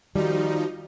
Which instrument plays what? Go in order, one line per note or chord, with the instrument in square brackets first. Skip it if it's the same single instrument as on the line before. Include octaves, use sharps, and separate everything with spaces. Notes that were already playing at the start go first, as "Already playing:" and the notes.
[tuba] D#3 [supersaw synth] F3 D#4 [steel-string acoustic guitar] G3 [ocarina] F#4